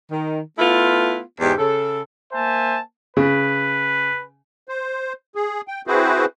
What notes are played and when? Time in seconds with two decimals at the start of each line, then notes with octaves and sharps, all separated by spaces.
0.10 D#3
0.58 A3 B3 E4 F4
1.40 E2 G#2 G#3 G4
1.58 C#3 A4
2.33 A#3 C5 E5 G#5 A5
3.17 C#3 B4
4.69 C5
5.35 G#4
5.68 G5
5.87 C4 E4 F#4 G#4 B4 C5